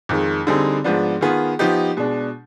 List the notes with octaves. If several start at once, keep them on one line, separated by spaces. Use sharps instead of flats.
F2 D#3 G#3
D3 G3 C4 D#4 G#4
G#2 F3 B3 D4
D#3 B3 F4 G#4
F3 B3 D#4 G4
B2 G#3 D4